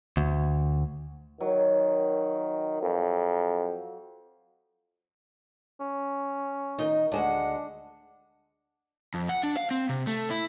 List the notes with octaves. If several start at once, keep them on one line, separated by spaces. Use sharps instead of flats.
D2
D#3 F#3
F2
C#4
D#3 D#4
D2 G#3 D4 F#5
F2
F#5
D4
F5
C4
C3
A3
E4